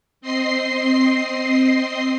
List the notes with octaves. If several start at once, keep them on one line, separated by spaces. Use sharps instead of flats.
C4 D#5 C6 C7